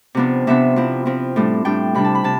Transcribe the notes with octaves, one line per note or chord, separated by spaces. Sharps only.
C3 F3 B3 D4
C3 F3 B3 D4 E5
F3 C4 E4
F3 C4 E4
A2 G3 D4
A2 G3 D4 G5
C3 G3 D4 B5
A5
B5
C3 A5